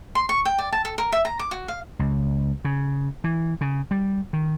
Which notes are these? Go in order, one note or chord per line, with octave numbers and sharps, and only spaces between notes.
C6
C#6
G5
D5
A5
A4
A#4
E5
A#5
D6
F#4
F5
C#2
C#3
E3
C#3
G3
D#3